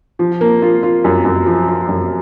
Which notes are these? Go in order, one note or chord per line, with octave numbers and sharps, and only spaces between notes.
F3
A#3
F4
F4
F#2
F#2
F3
F4
F#2